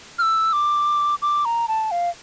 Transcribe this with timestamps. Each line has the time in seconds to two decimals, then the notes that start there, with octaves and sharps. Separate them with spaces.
0.19 F6
0.22 E6
0.53 D6
1.22 D6
1.45 A#5
1.68 A5
1.91 F5